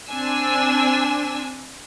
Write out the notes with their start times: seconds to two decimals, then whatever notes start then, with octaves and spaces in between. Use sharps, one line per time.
0.10 C4 D4 G#5 E6